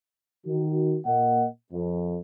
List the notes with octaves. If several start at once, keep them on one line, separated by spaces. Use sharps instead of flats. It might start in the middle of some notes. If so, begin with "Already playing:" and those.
D#3 F#4
A#2 A#3 D#5 F#5
F2